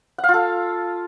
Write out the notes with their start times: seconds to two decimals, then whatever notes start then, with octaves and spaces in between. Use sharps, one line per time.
0.18 F#5
0.24 F5
0.29 F4
0.34 A4